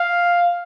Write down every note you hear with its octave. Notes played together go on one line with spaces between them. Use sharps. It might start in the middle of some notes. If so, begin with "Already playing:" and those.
Already playing: F5